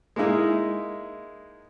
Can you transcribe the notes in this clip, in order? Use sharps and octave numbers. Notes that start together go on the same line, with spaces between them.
G#3 A#3 D#4 E4